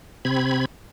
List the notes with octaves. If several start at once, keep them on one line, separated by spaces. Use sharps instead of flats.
C3 C4 B5 G#6